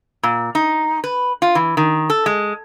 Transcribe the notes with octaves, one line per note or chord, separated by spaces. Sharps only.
A#2
D#4
B4
F4
E3
D#3
A4
G#3